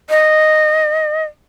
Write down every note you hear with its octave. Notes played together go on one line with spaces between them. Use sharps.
D#5